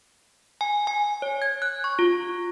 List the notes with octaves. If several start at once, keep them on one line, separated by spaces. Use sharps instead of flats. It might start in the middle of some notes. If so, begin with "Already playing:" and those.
G#5
G#5
C#5
G#6
F#6
C#6
F4